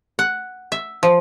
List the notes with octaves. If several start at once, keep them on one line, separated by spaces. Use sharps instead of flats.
F#5
E5
F3